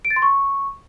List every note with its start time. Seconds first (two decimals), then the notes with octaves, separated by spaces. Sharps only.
0.05 D7
0.10 A6
0.16 C6
0.22 C#6